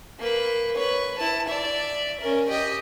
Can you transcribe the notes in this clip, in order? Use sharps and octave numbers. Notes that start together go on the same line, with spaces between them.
A#3 B4
B4 C#5
E4 A5
D5 E5
C#4 A#4
G4 D#5